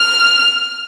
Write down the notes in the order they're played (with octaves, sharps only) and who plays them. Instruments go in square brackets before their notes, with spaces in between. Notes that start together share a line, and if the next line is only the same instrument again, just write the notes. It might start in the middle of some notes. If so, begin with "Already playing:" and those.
Already playing: [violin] F6